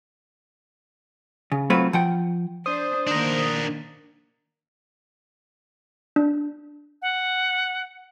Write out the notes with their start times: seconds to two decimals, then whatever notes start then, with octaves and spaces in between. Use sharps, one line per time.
1.52 C#3
1.70 F#3 A3 C4 F4 B4
1.93 F3 F#5 G5
2.66 D4 C5 D#6
3.07 D#3 A#3 D4 A#4
6.16 D4
7.02 F#5